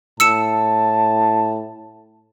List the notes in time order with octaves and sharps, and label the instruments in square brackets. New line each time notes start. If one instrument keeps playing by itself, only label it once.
[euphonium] A2 [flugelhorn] A5 [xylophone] E6 C#7 E7